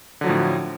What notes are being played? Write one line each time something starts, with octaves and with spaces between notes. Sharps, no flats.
A2 D3 F3 F#3